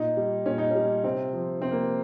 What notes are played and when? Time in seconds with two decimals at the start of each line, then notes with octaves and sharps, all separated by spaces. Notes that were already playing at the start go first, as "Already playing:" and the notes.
Already playing: A#2 D#4
0.17 G3
0.46 A#2 C#4
0.58 D#4
0.70 G3 C#4
1.04 C3 C4
1.33 F3
1.62 C3 C4
1.72 A#3